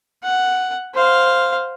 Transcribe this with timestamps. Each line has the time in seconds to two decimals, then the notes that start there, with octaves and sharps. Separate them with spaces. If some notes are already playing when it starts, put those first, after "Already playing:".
0.23 F#5
0.94 C5 F5